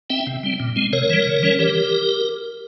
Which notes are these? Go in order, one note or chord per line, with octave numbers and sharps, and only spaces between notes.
C4 E5 G5
C3
G3 C4
A#2
G#3 C4
C3 A#4 C#5
E3 G3
C#3
E3 G3 C#4
E3 G4 A#4